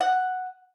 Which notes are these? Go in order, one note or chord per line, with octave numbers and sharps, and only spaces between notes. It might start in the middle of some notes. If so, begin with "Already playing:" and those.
F#5